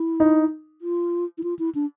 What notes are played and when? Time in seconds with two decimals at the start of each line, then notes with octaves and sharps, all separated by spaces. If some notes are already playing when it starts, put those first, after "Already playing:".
Already playing: E4
0.20 D#4
0.82 F4
1.38 E4
1.43 F4
1.59 E4
1.75 D4